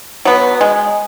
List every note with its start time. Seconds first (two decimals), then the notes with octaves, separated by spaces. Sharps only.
0.25 F#3 B3
0.61 G#3